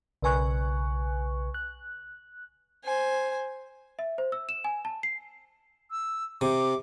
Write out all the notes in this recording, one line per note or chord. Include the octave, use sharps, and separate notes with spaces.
B1 C#3 B4 G#5 C#6 F#6
F#6
C5 G#5
E5
C5
E6
E7
G#5
A5
C7
E6
C3 D6